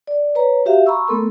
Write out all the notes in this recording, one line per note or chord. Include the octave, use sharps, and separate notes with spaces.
D5
B4 C#5 A#5
F#4 G4 E5 F5
A#5 B5 C#6 E6
A3 B3 A4 A#4 C6